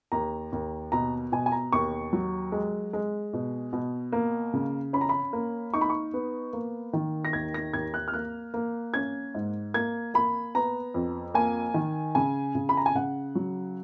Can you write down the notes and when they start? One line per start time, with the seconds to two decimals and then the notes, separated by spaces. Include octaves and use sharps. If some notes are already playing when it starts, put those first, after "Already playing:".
0.12 D#2 A#5
0.52 D#2
0.92 B2 A#5
1.32 B2 G#5
1.46 G#5
1.52 A#5
1.73 D#2 C#6
2.13 F#3
2.52 G#3
2.93 G#3
3.33 B2
3.73 B2
4.12 A#3
4.53 C#3
4.93 C#4 B5
5.01 A#5
5.09 B5
5.33 A#3
5.74 D#4 C#6
5.81 B5
5.90 C#6
6.14 B3
6.53 A#3
6.93 D#3
7.25 A#6
7.33 D#2 G#6
7.54 A#6
7.73 D#2 G#6
7.94 F#6
8.08 F6
8.14 A#3 F#6
8.54 A#3
8.94 C#4 G#6
9.35 G#2
9.74 A#3 G#6
10.14 A#3 B5
10.55 B3 A#5
10.94 F2
11.34 A#3 G#5
11.74 D#3
12.15 C#3 G#5
12.55 C#3
12.69 B5
12.77 A#5
12.86 G#5
12.95 C#3 F#5
13.35 F#3